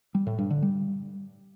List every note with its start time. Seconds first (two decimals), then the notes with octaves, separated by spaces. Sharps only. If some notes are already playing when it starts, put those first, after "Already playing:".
0.15 G3
0.27 A2
0.39 G2
0.51 D3
0.62 G3